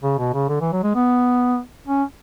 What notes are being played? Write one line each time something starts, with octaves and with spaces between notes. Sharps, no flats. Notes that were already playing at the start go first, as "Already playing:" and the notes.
C#3
B2
C#3
D3
E3
F#3
G#3
B3
C#4